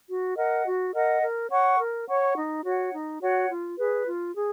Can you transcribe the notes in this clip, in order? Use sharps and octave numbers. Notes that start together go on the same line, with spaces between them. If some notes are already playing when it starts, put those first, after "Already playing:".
F#4
A#4 D#5 F#5
F#4
A#4 D#5 F#5
A#4
C#5 F#5 C#6
A#4
C#5 F#5 C#6
D#4
F#4 C#5 F#5
D#4
F#4 C#5 F#5
F4
G#4 B4
F4
G#4